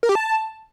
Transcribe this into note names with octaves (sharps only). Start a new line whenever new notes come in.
A#4
G4
A5